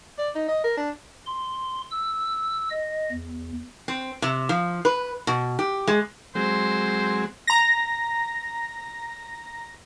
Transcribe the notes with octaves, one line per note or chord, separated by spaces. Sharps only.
D5
D#4
D#5
A#4
D4
C6
E6
D#5
E2
C4
C3
F3
B4
B2
G4
G#3
F#3 G#3 C4 C5
A#5 A#6